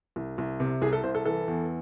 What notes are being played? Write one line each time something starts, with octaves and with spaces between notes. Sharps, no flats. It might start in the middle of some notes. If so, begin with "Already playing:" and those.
C2
C2
C3
C2 G#4
A4
C2 C5
A4
E3 A4
E2